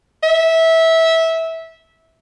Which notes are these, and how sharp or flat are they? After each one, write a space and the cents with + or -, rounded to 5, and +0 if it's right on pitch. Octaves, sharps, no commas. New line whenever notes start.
E5 -20